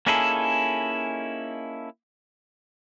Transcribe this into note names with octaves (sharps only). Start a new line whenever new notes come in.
A#3 C#4 D#4 E4 G#4 A4